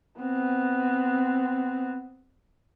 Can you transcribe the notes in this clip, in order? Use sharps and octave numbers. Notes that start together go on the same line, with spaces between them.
B3 C4